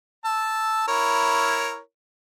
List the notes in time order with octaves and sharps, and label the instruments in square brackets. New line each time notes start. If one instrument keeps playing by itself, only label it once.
[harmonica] A5 E6
E4 A#4 C#5